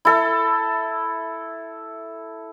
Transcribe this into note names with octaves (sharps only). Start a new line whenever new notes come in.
E4 A4 E5